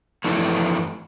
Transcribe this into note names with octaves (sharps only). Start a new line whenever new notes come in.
F2 E3 A3